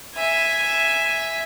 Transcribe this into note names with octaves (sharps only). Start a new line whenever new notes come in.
E5 G#5